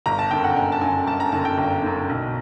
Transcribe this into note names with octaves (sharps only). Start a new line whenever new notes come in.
G1 A#5
A5
F#2 D3 G5
F#5
G1 G#5
A5
F#2 D3 G#5
G1 A5
A#5
F#2 D3 A5
G5
G1
F#2 D3
B1